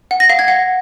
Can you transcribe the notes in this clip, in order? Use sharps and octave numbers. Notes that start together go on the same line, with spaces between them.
F#5
A#6
F5
G#6
F#5